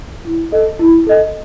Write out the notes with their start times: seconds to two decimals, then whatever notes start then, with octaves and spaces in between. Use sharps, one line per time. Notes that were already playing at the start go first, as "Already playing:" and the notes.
0.25 E4
0.52 A4 D#5
0.79 E4
1.07 A4 D#5